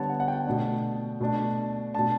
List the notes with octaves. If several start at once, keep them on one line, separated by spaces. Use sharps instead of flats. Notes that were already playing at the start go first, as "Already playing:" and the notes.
Already playing: D3 G3 B3 D4 C#5 A5
F#5
F#5
G5
B2 A3 D4
B2 A3 D4
B2 A3 D4 A5